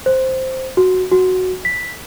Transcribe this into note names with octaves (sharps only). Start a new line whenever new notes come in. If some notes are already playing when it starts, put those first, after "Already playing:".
C5
F#4
F#4
B6